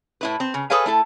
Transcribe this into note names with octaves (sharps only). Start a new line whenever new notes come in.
A2 E4 B4
C4
C#3
G#4 A4 B4 C#5 F5 G#5
A3 E4 A4